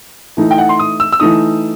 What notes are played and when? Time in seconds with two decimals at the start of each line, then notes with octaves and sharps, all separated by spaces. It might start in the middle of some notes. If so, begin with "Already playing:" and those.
0.37 E3 A3 D#4
0.51 G5
0.58 F#5
0.69 C6
0.79 D#6
1.00 E6
1.12 E6
1.20 E3 A3 D#4 D#6